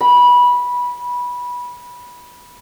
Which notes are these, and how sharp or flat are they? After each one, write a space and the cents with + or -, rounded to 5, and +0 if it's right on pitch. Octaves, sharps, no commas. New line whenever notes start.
B5 -15